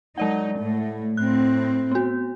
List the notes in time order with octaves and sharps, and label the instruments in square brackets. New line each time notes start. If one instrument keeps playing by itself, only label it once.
[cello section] F#3 D#4 [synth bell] G#3 D5 F#5
[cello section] A2 A3
[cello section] A2 C4 [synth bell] F#6
[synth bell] B3 F#4